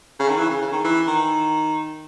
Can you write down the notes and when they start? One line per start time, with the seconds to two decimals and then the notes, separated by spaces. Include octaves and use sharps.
0.20 C#3
0.29 D#3
0.38 E3
0.50 C#3
0.61 C#3
0.72 D#3
0.84 E3
1.07 D#3